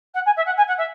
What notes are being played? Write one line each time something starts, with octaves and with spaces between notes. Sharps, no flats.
F#5
G#5
E5
F#5
G#5
F#5
E5